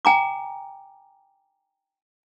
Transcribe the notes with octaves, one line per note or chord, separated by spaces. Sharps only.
G5 G#5 A#5 D6